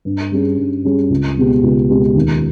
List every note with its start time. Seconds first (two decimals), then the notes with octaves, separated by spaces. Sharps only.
0.05 G2
0.31 G3 C#4 G#4
0.58 G2
0.85 G3 C#4 G#4
1.10 C#2
1.37 B2 G#3 B3 G4
1.63 C#2
1.89 B2 G#3 B3 G4
2.15 D#2